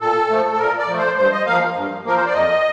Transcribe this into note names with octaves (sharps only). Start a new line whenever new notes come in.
A#2 A4
F3 A3
A4
A#2 A#4
D5
F3 A3
C5
G2 C5
D#5
F3 A#3 F5
G2
F3 A#3 A#4
C5
D5
F2 D#5